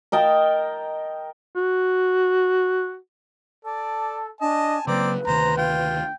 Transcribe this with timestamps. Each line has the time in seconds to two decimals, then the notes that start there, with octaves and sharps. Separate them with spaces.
0.12 A#4 D#5 G5 A5
1.56 F#4
3.65 A4 D5 A5
4.41 D4 D#5 G#5 A5
4.87 C#3 F#3 A#3 C4 B4 D5 A#5
5.26 D2 C3 D#3 C5 A#5
5.57 F4 G5